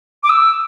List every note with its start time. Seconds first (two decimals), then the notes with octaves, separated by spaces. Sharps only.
0.23 D6
0.29 E6